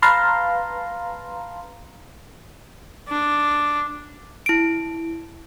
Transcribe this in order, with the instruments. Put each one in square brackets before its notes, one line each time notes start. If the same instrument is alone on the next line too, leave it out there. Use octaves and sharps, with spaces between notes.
[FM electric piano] B4 F5 A5 A#5 C6
[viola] D4
[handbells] E4 D7